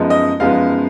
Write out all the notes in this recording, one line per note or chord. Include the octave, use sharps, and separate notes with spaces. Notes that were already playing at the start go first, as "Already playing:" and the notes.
Already playing: F#2 F3 G#3 B3 D#4
D#5
F#2 F3 G#3 B3 D#4 F5